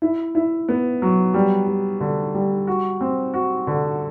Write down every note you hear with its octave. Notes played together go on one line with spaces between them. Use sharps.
E4
E4
B3
F#3
G3
G3
D3
G3
F#4
C4
F#4
D3